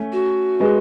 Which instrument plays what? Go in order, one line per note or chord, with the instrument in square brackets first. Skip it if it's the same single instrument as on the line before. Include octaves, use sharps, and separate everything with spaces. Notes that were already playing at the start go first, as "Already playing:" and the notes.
Already playing: [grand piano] A3 C#4
[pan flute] F#4
[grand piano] G#3 B3